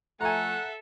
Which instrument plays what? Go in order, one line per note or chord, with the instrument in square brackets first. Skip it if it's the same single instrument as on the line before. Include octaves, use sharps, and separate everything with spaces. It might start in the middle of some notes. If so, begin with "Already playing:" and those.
[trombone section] F3 A3 [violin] A4 E5 [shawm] F#5 [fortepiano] G#5 A#5